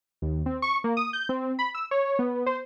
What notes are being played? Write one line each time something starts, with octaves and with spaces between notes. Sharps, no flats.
D#2
C4
C#6
A#3
D#6
G6
C4
B5
E6
C#5
B3
C5